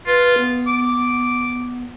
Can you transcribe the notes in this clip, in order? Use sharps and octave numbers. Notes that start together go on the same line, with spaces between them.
F4 B4
B3
D6